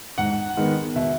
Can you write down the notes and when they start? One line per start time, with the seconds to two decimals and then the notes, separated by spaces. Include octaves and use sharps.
0.18 G#2 F#5
0.57 D#3 G#3 B3
0.96 B2 E5